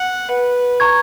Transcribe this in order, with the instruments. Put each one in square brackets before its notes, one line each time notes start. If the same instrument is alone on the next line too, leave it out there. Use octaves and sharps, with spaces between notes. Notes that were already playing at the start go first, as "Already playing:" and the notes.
Already playing: [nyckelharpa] F#5
B4
[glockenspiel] A#5 C#6 G#6